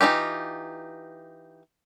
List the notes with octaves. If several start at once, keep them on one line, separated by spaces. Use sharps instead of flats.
E3 D#4 F4 G4